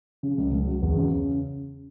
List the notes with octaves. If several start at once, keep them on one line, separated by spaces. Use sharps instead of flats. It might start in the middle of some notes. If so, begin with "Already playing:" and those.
C#3
C#2
C#2
F#3
E2
C#3